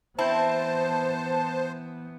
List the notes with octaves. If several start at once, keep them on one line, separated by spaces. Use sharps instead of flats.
E3 B3 C4 E4 C5 A5